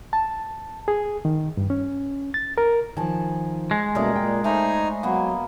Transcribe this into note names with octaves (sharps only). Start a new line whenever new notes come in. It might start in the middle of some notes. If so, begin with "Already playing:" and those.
A5
G#4
D#3
G2
C#4
A6
A#4
D#3 F3 G#5 A5
G#3
B2 G3 A3 A#3 C#4 A#4 D5 D#5
A#2 G5
A3 D#4 C5 G#5 A#5 B5
F#3 A#3 B3